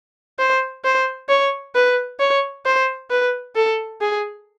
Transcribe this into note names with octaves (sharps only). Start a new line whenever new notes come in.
C5
C5
C#5
B4
C#5
C5
B4
A4
G#4